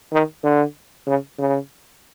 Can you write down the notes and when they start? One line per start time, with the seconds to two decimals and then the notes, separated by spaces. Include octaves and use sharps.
0.12 D#3
0.44 D3
1.07 C#3
1.38 C#3